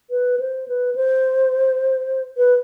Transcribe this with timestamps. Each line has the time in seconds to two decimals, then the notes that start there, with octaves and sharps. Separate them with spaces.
0.10 B4
0.40 C5
0.68 B4
0.95 C5
2.37 B4